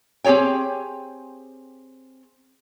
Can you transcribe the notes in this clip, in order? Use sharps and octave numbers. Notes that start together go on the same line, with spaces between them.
C4 G4 G#4 C#5 G5